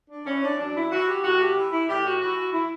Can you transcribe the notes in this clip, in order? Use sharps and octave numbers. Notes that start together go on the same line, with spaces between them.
D4
E3 C#4
D4
F#2 D4
E4
E3 F#4
G4
A2 F#4
G4
E3
E4
A2 G4
F#4
E3 F#4
F#4
E4